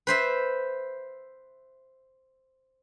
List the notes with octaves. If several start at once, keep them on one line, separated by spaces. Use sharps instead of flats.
B4 C5 E5